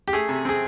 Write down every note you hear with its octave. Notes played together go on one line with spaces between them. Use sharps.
G4
A3 G#4
C3
C4 G#4